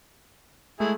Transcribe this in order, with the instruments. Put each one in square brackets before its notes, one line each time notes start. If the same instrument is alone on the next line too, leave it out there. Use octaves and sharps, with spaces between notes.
[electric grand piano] G#3 A3 [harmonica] E4 G#4